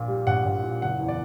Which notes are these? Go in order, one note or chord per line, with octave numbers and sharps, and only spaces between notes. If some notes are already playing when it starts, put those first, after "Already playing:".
Already playing: A#1 A#2
G3
A#1 F#5
A#1
A#2
F#1 F#5
E2
D5